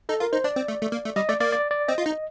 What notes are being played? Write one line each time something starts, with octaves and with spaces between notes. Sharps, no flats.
D#4 A4
F4 A#4
D#4 C5
D4 D5
C4
A3
A3
A#3
A3
G3 D#5
A3 D5
A#3 D5
D5
D5
C4 D#5
F4
D#4